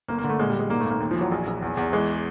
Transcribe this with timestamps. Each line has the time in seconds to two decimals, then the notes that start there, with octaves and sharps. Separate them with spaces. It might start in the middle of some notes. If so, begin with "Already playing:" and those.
0.08 G1 A#3
0.18 A#3
0.24 D3
0.29 A3
0.39 A#2 G#3
0.50 G3
0.54 A#2
0.59 G#3
0.70 G#2 A#3
0.80 A3
0.85 G#1
0.90 A#3
1.00 D#2
1.11 F3
1.16 E3 F#3
1.32 A#1
1.47 A#1
1.62 E2
1.77 E2
1.93 E3 G#3